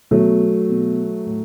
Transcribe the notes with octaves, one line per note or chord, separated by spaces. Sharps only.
B2 F#3 A3
B2
A2